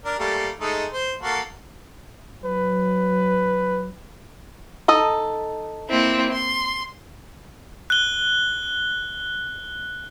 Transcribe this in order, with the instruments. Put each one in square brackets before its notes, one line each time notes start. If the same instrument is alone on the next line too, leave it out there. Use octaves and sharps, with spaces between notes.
[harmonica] D4 A#4
G3 A3 A#3
G#3 A3 D#4
C5
A#3 F#4 A4
[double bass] F#3 [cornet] B4
[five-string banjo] D#4 A4 D#5
[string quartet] A#3 C4 E4
C6
[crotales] F#6 G7